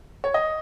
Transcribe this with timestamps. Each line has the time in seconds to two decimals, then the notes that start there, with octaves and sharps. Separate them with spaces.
0.24 C#5
0.34 D#5